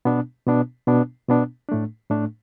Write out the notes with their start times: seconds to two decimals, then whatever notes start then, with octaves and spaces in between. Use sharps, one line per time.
0.05 B2 B3 D4
0.47 B2 B3 D4
0.87 B2 B3 D4
1.28 B2 B3 D4
1.69 A2 A3 D4
2.10 A2 A3 D4